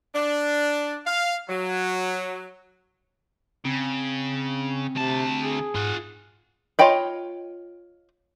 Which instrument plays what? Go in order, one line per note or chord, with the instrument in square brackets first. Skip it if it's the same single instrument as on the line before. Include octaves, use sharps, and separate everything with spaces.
[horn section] D4
F5
F#3
[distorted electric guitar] C#3 [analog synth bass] C4
[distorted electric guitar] D2 A5 [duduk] C3
[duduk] G#4
[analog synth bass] G#2 [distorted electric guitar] F4 F#5
[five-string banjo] F4 C#5 D#5 G5 B5